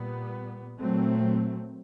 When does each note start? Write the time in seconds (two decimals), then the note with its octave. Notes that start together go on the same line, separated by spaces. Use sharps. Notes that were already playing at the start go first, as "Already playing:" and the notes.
Already playing: A#2 G3 B3
0.79 A#2 F#3 A3 C4